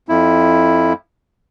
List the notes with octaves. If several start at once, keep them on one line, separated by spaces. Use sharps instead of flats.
F2 E4